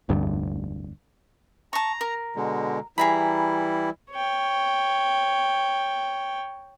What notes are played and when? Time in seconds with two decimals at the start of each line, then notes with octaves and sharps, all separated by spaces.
0.09 F1 D2 G2
1.73 A5 A#5 C#6
2.01 A#4
2.36 B2 D3 G#3
2.98 E3 G3 E4 G#4 A#5 B5
4.12 C#5 G5